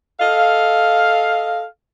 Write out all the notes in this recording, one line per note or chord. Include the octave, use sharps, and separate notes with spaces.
A4 D#5 F5